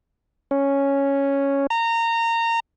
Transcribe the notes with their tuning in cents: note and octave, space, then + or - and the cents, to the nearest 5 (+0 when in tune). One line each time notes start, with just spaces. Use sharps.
C#4 +0
A#5 -20